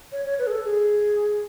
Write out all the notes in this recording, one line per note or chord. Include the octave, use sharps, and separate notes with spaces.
C#5
C#5
B4
G#4
A4
G#4